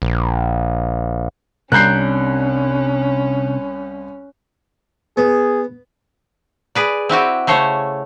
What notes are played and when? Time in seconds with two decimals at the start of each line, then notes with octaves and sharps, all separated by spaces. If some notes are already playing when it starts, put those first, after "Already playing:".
0.02 A#1
1.72 C2 C3 C#4 D4 A#5 F#6 G6 C7
5.17 B3 G#4
6.75 G#4 B4 D5
7.09 C4 E4 F#4 G4
7.47 C#3 A3 C5 C#5